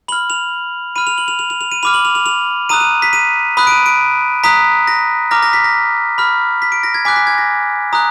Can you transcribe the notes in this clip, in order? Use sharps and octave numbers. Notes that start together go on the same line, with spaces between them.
B5 F6 F#7
F7
B5 F6 D#7
F7
F#7
F7
F7
F7
F7
D#7
B5 D6 F6 F7
F#7
F7
F7
F7
A#5 D#6 F#6 D#7
D#7
B6
D#7
B5 D#6 F#6
D7
D#7
D7
A#5 D#6 F#6 B6
A#6
A#5 D6 F6 A#6
A#6
B6
A#6
B5 F6
B6
D7
A#6
G#6
G#5 D6 F#6 B6
B6
G#6
A#6
A#5 D#6 F#6